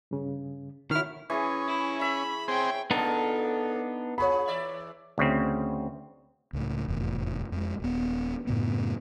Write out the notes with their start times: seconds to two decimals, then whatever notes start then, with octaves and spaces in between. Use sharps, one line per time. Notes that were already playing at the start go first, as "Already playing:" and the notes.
0.11 G2 C#3
0.91 D3 D#3 E4 F#4 C#5 F6
1.30 E3 C#4 G#4 C#6
1.68 E4
2.01 E5 B5
2.48 C4 G#4 C5 C#5 G5
2.91 A#2 C#3 B3 D4 D#4 A4
4.18 F4 G#4 C#5 B5
4.48 E2 D5 E5
5.18 D2 C#3 C4
6.53 C#2 A2
6.88 F1 E2 A2
7.52 F2 G#3
7.80 D#1 B3
8.47 F#2 A2 C#3 B3